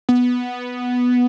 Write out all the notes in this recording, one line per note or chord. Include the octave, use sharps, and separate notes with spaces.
B3